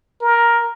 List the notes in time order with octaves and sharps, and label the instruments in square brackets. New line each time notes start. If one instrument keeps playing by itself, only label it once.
[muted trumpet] A#4